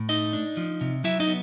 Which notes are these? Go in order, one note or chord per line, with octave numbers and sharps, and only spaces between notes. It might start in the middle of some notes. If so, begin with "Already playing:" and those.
Already playing: A2
A3 D#4 D#5
D4
F3
C3
F#3 E4 E5
D#4 D#5
B3